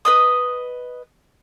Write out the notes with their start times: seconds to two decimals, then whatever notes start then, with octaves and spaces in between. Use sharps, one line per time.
0.05 B4 D#5 D#6